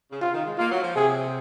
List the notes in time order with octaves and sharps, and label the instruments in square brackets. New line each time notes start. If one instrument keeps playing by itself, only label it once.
[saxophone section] C#3
[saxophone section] C3 [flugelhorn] F4
[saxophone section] D#3
G#3
[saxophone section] A#3 [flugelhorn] F4
[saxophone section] F#3
F3
[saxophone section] C3 [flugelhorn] G#4